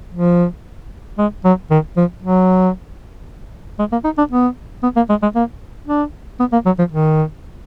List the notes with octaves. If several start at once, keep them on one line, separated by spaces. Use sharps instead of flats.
F3
G#3
F#3
D#3
F3
F#3
G#3
A#3
D#4
D4
B3
B3
A#3
G#3
G#3
A#3
D4
B3
A#3
F#3
F3
D#3